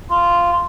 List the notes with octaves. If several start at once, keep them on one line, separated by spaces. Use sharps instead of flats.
F4